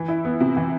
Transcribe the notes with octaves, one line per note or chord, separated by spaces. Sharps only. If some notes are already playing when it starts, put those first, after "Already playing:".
Already playing: E3
E4
B3
C3
E3